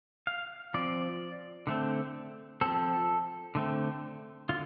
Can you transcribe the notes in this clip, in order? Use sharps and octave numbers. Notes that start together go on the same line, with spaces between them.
F5
F3 C4 D5
D3 A3 C4
F3 C4 A4
D3 A3 C4
D3 F4